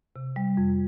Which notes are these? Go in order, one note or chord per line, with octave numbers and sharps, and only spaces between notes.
C3
G3
F2